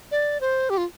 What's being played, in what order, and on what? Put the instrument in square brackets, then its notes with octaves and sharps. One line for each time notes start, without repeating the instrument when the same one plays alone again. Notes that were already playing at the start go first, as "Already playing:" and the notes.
[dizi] D5
C5
G4
F4